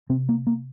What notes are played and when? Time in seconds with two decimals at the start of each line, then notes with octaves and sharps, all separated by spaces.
0.09 C3 C4
0.29 A#3
0.47 A#3